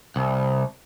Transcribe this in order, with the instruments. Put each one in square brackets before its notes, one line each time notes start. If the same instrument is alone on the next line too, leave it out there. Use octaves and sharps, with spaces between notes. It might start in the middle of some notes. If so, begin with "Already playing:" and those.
[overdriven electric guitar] C2